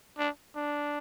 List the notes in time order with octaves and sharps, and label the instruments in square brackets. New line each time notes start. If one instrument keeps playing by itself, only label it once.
[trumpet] D4
D4